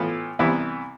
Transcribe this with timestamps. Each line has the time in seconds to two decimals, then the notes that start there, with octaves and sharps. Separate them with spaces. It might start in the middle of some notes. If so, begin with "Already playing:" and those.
Already playing: A2 E3 B3 F4
0.39 C2 C3 E3 B3 E4